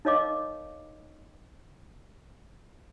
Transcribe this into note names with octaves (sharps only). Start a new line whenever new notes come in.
D#4 A#4 C#5 D#5 F5 D6